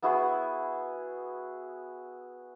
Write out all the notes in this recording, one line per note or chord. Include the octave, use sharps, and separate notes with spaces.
B3 E4 F#4 G#4